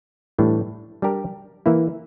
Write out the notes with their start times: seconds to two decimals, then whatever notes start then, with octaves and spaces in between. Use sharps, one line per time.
0.39 A2 E3 G3 D4
1.02 G3 D4 G4 A#4
1.66 E3 A#3 E4